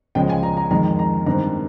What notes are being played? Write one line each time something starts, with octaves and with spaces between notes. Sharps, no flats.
C#2 C#3 F3 G#3 G5
G#5
A#5
A#5
F2 D#3 G#3 A#5
A#5
G2 D#3 G#3 C4 A#5